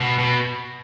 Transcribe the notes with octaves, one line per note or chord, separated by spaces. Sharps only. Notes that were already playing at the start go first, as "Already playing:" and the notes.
B2
B2